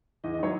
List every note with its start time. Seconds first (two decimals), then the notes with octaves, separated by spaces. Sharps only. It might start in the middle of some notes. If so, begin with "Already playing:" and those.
0.24 E2 D#5
0.34 D#5
0.39 D#3 F#3 C#5